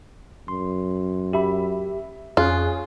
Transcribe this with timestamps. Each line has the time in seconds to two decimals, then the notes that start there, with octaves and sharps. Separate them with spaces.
0.48 F#2 C6
1.33 G4 E5 B5
2.37 F2 C#4 F4 G#4 F#6